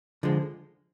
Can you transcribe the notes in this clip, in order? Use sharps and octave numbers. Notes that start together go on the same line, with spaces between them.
D3 F3 G#3